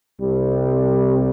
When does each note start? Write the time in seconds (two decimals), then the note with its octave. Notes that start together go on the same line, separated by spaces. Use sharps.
0.21 C2 C3 G3